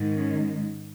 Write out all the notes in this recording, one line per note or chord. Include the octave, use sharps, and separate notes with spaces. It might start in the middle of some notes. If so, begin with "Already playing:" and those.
Already playing: G#2 D#3 G#3
C#4